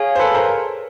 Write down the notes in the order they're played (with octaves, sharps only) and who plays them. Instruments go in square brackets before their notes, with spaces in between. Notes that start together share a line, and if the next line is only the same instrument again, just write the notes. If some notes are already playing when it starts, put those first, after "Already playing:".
Already playing: [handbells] G#4 C#5 F5 G#5
[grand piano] C5
A4 B4
A#4 C5